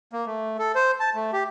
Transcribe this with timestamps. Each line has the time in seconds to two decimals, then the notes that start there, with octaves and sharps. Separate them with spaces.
0.13 A#3
0.26 A3
0.59 A4
0.75 C5
1.00 A5
1.15 A3
1.33 G4